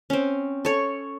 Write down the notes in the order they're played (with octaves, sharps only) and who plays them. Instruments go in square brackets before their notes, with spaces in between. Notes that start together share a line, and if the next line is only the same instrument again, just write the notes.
[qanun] C4 C#4
A4 C#5